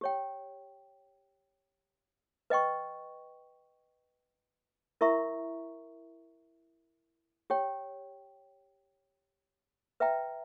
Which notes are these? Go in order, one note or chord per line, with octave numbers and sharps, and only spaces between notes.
G4 C#5 G5
B4 D#5 G5 C#6
E4 A#4 E5 A#5 C#6
G4 C#5 G5
B4 E5 G5 A#5